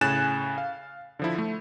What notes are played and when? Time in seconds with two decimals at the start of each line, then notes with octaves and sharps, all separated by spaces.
0.01 A2 C#3 G#5 F#6 A6 E7
0.58 F5
1.19 D3 F3 E4
1.38 A3